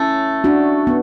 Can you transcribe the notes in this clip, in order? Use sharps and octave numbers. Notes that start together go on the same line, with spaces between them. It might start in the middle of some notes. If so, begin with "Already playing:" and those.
Already playing: A3 C#4 E4
D4 F#4
B3